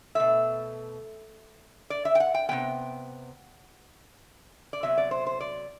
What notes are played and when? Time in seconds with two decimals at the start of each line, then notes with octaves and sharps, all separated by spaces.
0.15 B2 A3 E5
1.90 D5
2.05 E5
2.15 G5
2.20 F#5
2.34 G5
2.49 C3 G3 B3 G5
4.73 D5
4.83 C3 F#3 B3 E5
4.98 D5
5.11 C5
5.27 C5
5.41 D5